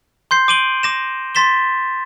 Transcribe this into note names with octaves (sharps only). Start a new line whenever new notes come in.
C6 G6 C7
D6 D7 D#7 F#7 G7
D6 A#6 E7
C6 A6 B6 E7 G7